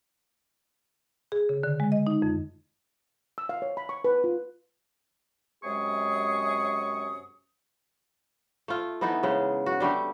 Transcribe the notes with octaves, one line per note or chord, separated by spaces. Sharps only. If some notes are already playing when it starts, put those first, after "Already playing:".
G#4
C#3
D3
G#3
D#5
D#4
F2
E6
F5
C#5
B5
C#6
B4
F4
F#2 C3 G#3 G#4 C#6 D#6
A3 F4
E3 B3 D#4 A4
C#3 G#3
F#4
D3 G3 A3 G4